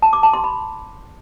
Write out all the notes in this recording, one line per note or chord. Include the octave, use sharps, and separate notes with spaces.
A5
D6
A5
C6
B5